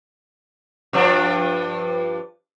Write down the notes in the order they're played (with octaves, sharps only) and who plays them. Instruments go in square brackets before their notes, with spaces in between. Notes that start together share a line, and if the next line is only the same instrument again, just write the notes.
[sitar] G2 F3 D4